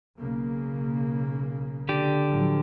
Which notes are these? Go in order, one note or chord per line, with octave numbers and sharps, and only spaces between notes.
B1 C#3 A#3
D3 G4 D5
A2 F3 F#3